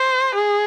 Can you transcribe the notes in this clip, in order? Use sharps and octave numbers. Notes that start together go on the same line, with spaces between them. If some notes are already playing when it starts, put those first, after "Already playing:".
Already playing: C5
G#4